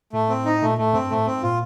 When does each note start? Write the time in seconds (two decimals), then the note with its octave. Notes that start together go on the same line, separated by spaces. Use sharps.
0.13 A2 A3
0.29 C4
0.45 D#4
0.62 A#2 A3
0.78 A2 A3
0.93 G2 C4
1.10 A2 A3
1.26 G#2 C4
1.43 A#2 F4